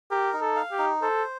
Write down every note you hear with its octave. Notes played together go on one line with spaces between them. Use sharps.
G4 A#4
D#4
A4
F5
G4
D#4
A4 C5